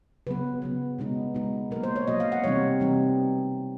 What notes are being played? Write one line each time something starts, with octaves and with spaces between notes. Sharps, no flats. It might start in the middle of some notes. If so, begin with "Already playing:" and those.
C#3 F#3 B3 B4
C#3 F#3 B3
B2 G#3 B3 D#4
B2 G#3 B3 D#4
B2 F#3 A#3 A#4
C5
C#5
B2 F#3 A#3 D#5
F5
F#5
C3 E3 G3 C4 D#4 C#5
C3 E3 G3 C4 D#4